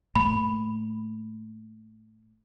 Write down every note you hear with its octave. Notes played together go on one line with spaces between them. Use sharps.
A2 A3 A#3 B5